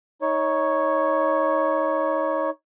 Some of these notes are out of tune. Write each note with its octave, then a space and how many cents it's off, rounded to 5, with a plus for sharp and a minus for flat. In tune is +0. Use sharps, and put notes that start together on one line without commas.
D#4 +20 C#5 +0